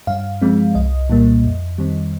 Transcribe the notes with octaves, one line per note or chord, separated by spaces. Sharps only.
G2 F5
F3 G#3 C4
C2 D#5
A#2 G3 A#3
F2
D#3 G3 C4